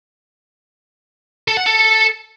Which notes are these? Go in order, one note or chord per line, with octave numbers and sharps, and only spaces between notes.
A4
F#5
A4